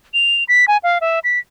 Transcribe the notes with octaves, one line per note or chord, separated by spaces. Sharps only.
F7
B6
G#5
F5
E5
B6